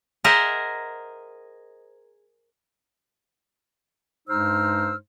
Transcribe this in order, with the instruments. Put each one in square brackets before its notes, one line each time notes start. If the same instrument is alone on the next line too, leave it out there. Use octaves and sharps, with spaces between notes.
[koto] G#4 A#4 C5 D#5 E5 F#5
[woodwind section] G2 G#3 D#4 C5 E6 F6